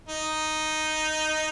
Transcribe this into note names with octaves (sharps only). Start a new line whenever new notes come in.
D#4